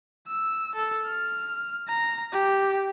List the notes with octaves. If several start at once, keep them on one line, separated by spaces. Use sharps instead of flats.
E6
A4
F6
A#5
G4